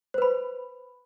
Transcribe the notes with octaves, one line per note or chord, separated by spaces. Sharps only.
B4 C5 B5